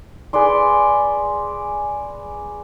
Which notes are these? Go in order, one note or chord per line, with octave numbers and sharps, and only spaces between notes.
G#4 B4 D5 C6